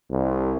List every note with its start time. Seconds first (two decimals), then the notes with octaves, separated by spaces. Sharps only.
0.10 C2